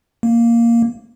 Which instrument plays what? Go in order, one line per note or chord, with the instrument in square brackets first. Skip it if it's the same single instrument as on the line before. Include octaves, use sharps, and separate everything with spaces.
[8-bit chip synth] A#3